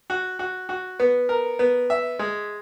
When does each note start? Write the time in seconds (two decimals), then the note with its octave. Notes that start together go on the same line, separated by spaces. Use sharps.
0.10 F#4
0.39 F#4
0.69 F#4
1.00 B3
1.29 A#4
1.59 B3
1.90 E5
2.19 G#3